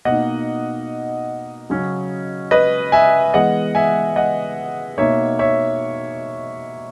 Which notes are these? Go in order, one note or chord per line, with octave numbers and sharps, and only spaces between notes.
B2 A#3 D#4 D#5 F#5
C#3 F#3 C#4
B4 D#5
E5 G#5
E3 G#3 B3 D#5 F#5
E5 G#5
D#5 F#5
B2 A#3 D#4 C#5 E5
C#5 E5